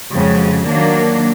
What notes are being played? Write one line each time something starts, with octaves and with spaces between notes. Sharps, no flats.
F2 G#2 C#3 F#3
D#3 F#3 A#3 D4